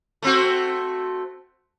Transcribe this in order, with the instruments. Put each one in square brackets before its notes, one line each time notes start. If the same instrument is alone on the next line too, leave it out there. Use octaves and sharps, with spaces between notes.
[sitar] A3 C4 F#4